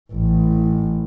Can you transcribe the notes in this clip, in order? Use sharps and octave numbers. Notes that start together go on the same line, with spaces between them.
A1